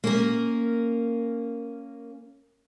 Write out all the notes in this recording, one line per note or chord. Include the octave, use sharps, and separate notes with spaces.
A#3 C#4 A#4